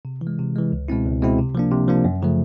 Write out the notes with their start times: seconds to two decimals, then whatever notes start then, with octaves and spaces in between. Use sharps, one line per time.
0.05 C3
0.21 E3
0.27 G#3
0.39 C3
0.56 E3 G#3
0.73 C#2
0.88 B2 G#3 C4 E4
1.05 C#2
1.22 B2 G#3 C4 E4
1.38 C3
1.55 F3 A#3 D4
1.71 C3
1.88 F3 A#3 D4
2.04 F#2
2.22 C#3 F3 A3